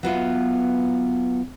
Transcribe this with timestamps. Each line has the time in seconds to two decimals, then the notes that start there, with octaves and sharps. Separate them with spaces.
0.03 F#3 B3 F4 E5